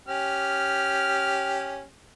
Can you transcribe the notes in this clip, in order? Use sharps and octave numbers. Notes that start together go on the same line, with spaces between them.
C#4 G4 F6